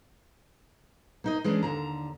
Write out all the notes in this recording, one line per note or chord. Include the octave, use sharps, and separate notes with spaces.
A#3 D#4 D#5
E3 G#3 C#4 D4
D#2 D3 A#5